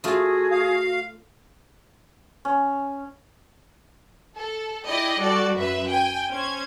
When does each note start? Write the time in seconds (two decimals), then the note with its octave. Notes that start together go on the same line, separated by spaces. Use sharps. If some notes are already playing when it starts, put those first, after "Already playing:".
0.04 A3 F4 F#4 G#4 D#6
0.51 F5
2.45 C#4
4.36 A4
4.85 E4 G#4 D5 D#5 G5
5.21 G3 F#4 A4 D5
5.58 F#2 B4 E5
5.88 G5 G#5
6.31 C#4 C5 G#6